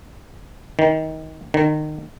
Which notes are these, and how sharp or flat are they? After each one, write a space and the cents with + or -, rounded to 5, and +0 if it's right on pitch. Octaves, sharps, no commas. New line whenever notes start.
D#3 +20
D#3 -30